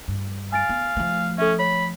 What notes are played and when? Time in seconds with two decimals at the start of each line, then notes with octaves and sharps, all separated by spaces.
0.08 G2
0.52 F5 G#5 A6 D7
0.69 B3
0.97 F3 A3
1.38 C#4 A4 E5
1.59 C#5 B5